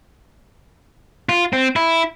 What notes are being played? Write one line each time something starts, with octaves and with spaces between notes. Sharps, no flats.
F4
C4
E4